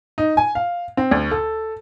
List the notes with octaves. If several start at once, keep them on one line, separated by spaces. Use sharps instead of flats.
D#4
G#5
F5
C4
D2
A4